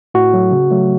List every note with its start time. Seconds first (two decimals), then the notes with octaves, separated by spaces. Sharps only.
0.14 A2 F#4
0.34 F#3 A3
0.51 C#3
0.71 F#3 A3